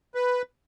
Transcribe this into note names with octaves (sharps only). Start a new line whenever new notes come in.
B4